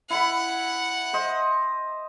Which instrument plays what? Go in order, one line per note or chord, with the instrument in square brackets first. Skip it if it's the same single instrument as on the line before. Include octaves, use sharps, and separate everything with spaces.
[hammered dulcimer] E4 B5 [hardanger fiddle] F#5
[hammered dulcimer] C5 D#5